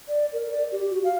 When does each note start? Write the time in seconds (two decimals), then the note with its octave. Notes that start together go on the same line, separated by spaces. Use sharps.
0.08 D5
0.33 A#4
0.51 D5
0.72 G4
0.91 F#4
1.04 F5